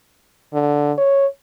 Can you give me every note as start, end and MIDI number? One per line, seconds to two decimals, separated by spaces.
0.54 0.92 50
0.98 1.26 73